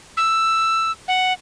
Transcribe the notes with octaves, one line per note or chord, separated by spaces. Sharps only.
E6
F#5